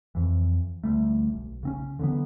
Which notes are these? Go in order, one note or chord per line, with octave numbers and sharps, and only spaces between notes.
F2 E3
D2 G3 A3
E1 B1
C#3 C4 C#4
D3 E3 F#3 B3